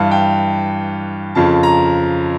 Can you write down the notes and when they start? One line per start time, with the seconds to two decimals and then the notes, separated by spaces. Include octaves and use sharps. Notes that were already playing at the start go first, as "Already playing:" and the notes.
Already playing: G2 E3 F5
0.11 G5
1.35 F2 C#3 F3 A5
1.63 A#5